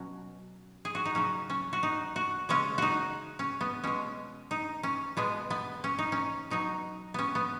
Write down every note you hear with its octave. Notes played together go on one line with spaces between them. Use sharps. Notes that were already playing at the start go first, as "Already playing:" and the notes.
Already playing: B2 F#3 C#4
G#4
F#4
D#4
C#3 F#3 C#4
C#4
F#4
D#4
F#4
C#3 G#3 C#4
D#4 F#4
C#4
B3
B2 G#3 C#4
D#4
C#4
B2 G#3 B3
B3
C#4
D#4
C#4
B2 F#3 D#4
B3 C#4
B3